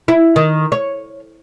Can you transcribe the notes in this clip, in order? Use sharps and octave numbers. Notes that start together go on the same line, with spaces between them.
E4
D#3
C#5